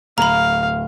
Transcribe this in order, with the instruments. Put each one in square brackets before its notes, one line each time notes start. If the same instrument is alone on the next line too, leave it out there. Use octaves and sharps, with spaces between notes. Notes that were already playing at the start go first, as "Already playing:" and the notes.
[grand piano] D1 [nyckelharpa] F5 [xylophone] A#5 B5